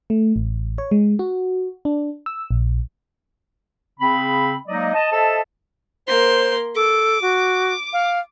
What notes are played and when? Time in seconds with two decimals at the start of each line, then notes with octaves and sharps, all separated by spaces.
0.10 A3
0.36 A1
0.78 C#5
0.91 G#3
1.19 F#4
1.85 D4
2.26 E6
2.51 A#1
4.00 C#3 C4 B5
4.68 F#3 G#3 A#3 D#4 D5 D#5
4.93 D#5 A5
5.12 A4 C5 D#5 E5 A5
6.07 A#3 C5 C6
6.75 A4 D6
7.22 F#4
7.93 F5